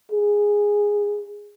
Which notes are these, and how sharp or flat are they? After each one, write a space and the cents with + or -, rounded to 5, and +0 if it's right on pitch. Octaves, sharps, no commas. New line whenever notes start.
G#4 -10